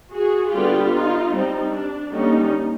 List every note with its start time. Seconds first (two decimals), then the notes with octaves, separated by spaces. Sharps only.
0.13 F#4 G#4
0.53 D3 G3 B3 F4 G4
0.93 D#4 F4
1.32 G3 C4 D#4
1.72 D4
2.11 D3 G3 A#3 C#4 D#4